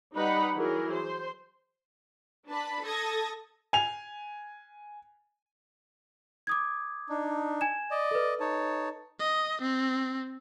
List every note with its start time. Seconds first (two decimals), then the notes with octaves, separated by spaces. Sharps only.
0.15 G3 D#4 G4 B4 F#5 B5
0.56 E3 F#3 G#4 A#4
0.94 C5
2.48 D4 B4 A5 B5
2.84 A4 A5 D#6 G#6 A#6
3.73 G#5 F7
6.47 D6 D#6 G#6
7.09 D4 D#4
7.61 G#5 G#6 E7
7.91 D5 D#5
8.11 A4 B4
8.40 D#4 C#5 A5
9.20 D#5
9.61 C4